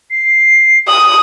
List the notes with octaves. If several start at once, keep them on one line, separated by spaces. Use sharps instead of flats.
C7
D#6 F#7